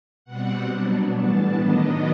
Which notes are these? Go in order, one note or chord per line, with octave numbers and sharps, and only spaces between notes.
B2 G3 C4 F#5
B2 F#3 B3 D4
A2 E3 G3 B3 D4 A5
D#3 F#3 B3 D4 D#5